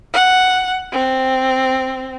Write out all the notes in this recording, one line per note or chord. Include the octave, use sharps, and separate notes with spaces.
F#5
C4